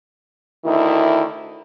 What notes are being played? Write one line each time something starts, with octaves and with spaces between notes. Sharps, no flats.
D2 D#3 E4